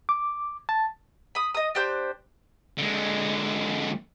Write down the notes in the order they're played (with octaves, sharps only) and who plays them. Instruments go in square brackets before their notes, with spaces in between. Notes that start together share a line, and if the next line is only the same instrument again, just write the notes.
[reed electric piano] D6
A5
[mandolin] B5 D#6
D#5 D#6
D4 G4 C5 G6
[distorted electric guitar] D3 G#3